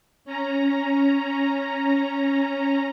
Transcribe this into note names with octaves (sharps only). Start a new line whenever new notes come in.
C#4 A#5